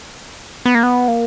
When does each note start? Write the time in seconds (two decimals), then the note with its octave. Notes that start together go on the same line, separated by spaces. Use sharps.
0.65 B3
0.75 A#3
0.83 B3
1.08 A#3